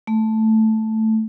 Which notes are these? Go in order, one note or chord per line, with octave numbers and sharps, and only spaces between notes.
A3